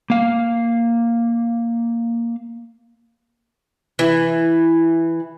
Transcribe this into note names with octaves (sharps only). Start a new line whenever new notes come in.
A#3 F5
E3